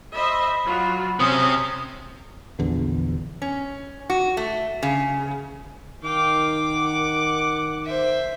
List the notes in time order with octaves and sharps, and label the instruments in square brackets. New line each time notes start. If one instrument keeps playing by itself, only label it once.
[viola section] C5 D#5 E5 [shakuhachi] B5
[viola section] F#3 F4 F#4
[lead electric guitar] C3 [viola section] C#4 [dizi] D#6
[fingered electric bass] A#1 E2 D3
[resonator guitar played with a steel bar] C#4
F#4
A3
C#3
[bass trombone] D#3 [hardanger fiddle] F5 G5 [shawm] D6
[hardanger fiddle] F#5
C5 E5